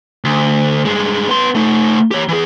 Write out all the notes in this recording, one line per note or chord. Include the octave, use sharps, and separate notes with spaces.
D2
G2 G#3
B3 C6
A3 D#4
G4 C#5
E3 G#4